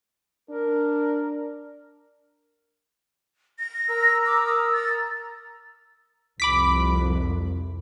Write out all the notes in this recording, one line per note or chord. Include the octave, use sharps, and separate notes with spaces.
D4 A#4
A#6
A#4 A#5 E6
D6
D#6
A6
C2 F2 C3 B5 D6 B6